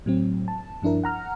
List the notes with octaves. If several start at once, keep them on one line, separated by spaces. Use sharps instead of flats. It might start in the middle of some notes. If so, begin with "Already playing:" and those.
A2 F#3 C4
A5
G2 F3 D4 E4 A#4
F#5 A#5 F6